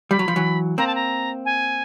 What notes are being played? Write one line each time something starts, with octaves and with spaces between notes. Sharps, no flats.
G3 B5
F#3
F3
E3 F#3
A#3 C4 A#5
A5
A#5
G#5